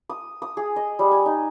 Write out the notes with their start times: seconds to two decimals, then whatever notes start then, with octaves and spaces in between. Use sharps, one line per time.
0.10 D#6
0.42 D#6
0.57 G#4
0.76 D#5
0.99 G3
1.11 G#5
1.26 D#4